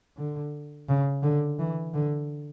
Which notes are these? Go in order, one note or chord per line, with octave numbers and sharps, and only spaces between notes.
D3
C#3
D3
E3
D3